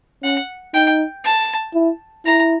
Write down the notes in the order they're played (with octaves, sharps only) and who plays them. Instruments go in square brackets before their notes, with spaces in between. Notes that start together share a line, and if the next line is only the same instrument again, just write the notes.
[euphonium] C#4 [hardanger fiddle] F#5
[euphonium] D#4 [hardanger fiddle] G5
[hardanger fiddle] A5
[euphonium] E4
[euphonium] E4 [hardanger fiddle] A#5